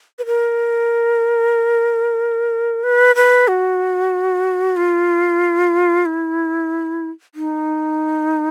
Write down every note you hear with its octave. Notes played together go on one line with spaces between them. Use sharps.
B4
A#4
B4
B4
F#4
F4
E4
D#4